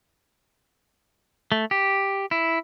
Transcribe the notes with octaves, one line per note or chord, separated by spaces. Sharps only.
A3
G4
E4